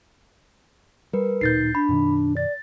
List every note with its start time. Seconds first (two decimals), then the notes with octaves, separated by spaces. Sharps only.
1.13 G3 A#4 B4
1.41 D1 A#2 D#4 G6 A6 C7
1.75 D4 B5
1.89 F#2 B2 D#3
2.37 D5 A6